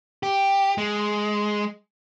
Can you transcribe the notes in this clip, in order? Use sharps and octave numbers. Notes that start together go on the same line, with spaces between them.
G4
G#3